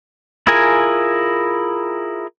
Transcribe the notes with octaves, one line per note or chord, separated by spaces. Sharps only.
E4 F4 G#4 A#4 G#5